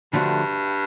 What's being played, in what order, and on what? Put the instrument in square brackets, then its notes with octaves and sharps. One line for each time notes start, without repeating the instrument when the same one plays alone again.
[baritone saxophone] G2 [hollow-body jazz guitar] D3 F3 A3 D4 F#4